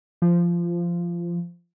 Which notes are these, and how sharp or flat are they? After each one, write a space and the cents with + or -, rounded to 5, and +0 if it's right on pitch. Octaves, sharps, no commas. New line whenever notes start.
F3 -20